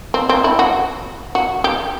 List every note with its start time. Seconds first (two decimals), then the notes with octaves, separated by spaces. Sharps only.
0.14 C4
0.29 C4
0.44 E4
0.59 F#4
1.35 F#4
1.64 G4